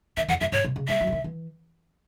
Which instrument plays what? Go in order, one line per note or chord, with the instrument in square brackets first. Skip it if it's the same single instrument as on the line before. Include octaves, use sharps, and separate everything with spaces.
[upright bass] D#3 [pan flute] E5
[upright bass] E2 [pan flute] F#5
[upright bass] F#2 [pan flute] E5
[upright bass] G#2 [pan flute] C#5
[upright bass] B2
C#3
[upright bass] G#3 [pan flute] E5
[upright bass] F#3
C#3
D#3
E3